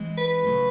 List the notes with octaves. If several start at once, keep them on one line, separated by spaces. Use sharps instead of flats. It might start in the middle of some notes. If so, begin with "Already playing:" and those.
Already playing: E3 G#3 C4
B4
C#3 F#3 A3